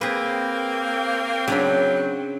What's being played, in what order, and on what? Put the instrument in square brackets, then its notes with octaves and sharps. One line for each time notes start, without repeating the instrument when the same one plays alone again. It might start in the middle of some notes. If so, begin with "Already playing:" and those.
[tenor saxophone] A#3 [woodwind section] C4 G5 [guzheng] G#4 B4
[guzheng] C#3 D4 B5 [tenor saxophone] F#3